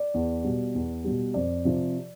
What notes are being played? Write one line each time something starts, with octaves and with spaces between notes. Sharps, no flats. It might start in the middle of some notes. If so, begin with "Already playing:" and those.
Already playing: D5
E2
B2 G3
E2
B2 G3
F2 D5
C3 F3